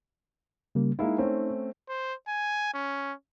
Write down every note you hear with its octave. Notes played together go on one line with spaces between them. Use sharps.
C#3 G3 A#3
G#3 A#3 D#4 E4
A3 C4 C#4
C5
G#5
C#4